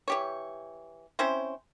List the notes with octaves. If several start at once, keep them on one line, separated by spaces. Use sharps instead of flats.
E3 G4 C#5
C4 C#4 E4 C5